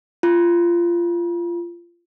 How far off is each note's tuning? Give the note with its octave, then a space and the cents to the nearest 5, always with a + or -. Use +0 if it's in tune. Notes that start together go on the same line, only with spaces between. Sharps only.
F4 -20